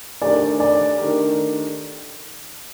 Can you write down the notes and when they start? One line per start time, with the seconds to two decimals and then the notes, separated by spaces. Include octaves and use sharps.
0.22 D#3 A3 D4 G4 A#4 D5
0.60 D5
0.99 D#3 A3 D4 G4 A#4